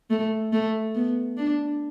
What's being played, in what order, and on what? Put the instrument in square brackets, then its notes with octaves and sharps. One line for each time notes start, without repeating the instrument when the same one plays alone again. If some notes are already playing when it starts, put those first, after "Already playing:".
[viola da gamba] A3
A3
B3
D4